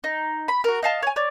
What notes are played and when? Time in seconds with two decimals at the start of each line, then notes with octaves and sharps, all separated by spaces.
0.04 D#4
0.48 B5
0.64 F#4 A#4
0.83 D#5 F5 A5
1.02 C#5 G#5
1.16 C#5 D5